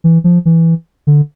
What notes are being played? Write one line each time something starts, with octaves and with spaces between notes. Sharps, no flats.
E3
F3
E3
D3